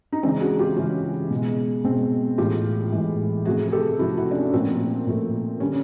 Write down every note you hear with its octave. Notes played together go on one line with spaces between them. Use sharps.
D#4
C#3 E3 G#3 C4 D4
F#4 G#4
F4 G4
C#3 E3 G#3 C#4
B2 G#3
B2 G#3 C4
A2 E3 G#3 F4 G4
A2 E3 G#3
C3 F3 A3 F#4 G#4
G#4
G4 A4
C3 F3 A3 E4 F#4
E4 F#4
D4
C#4
A#2 F3 A3 C4
A#2 F3 A3
D3 G3 C#4